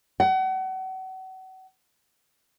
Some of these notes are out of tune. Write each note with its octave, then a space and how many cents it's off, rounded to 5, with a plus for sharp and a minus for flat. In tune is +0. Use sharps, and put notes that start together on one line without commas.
F#5 +35